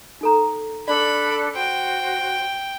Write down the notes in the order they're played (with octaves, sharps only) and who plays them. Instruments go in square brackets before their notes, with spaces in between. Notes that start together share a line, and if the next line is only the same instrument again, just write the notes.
[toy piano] D#4 A4 A#5
[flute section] D4 A4 F#6 [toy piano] D5 [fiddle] B5
[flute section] F#4 C5 [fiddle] G5